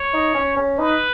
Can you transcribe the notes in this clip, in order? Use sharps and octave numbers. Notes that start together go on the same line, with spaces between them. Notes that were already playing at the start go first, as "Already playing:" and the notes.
Already playing: C#5
D#4
C#4
C#4
D#4 B4